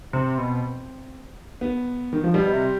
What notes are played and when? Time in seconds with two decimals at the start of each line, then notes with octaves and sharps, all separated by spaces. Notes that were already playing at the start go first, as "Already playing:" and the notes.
0.13 C3 C4
0.38 B2
1.61 B3
2.13 D#3
2.24 F3
2.34 B2 G3
2.53 C3